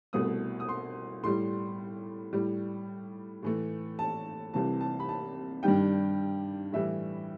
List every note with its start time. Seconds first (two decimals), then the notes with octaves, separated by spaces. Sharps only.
0.13 C2 B2 A3 D#6
0.60 D#6
0.69 C6
1.23 A2 G3 C6
2.33 A2 G3
3.43 A2 E3 A3
3.99 A5
4.53 C2 C3 E3 A5
4.81 A5
5.00 B5
5.09 A5
5.63 G2 D#3 G3 G5
6.72 A2 E3 G3 E5